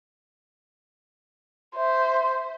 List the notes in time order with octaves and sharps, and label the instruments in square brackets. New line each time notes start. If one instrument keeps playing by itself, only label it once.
[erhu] C5 [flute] E5